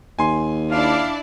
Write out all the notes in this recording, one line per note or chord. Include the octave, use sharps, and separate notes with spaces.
D#2 G#5 C6
D4 E4 D5 F5